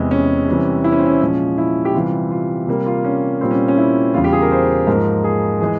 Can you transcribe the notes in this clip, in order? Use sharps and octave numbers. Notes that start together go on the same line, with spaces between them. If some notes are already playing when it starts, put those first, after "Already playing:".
Already playing: E2 C3 E3 G#3 E4
C#4
C3 E3 G3
E4
C#4
C4
C#4
A#2 F3 G#3 C#4
E4
G4
C3 E3 G3 F4
F4
C3 G3 A#3
F4
C#4
A#2 G3 A#3 C4
C#4
C#4
E4
E2 C#3 G3 F4
G4
G#4
A#4
C5
G#2 F3 A#3 A#4
G#4
E3 G#3 G#4